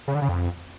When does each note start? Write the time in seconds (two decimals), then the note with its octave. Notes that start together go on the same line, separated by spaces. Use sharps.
0.08 C#3
0.15 D3
0.22 C#3
0.29 F2